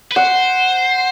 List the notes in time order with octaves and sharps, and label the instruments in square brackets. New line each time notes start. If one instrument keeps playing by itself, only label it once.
[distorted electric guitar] B4
[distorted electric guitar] C5 [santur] F#5